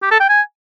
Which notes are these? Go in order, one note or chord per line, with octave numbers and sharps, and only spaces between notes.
G4
A4
G5
G#5